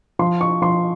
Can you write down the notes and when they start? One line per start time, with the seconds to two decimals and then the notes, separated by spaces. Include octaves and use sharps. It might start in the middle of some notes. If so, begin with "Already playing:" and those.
0.19 F3 C6
0.41 C#6
0.62 F3 C6